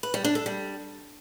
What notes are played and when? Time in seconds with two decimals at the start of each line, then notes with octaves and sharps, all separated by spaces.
0.03 B4
0.14 G3
0.25 D4
0.35 A4
0.46 G3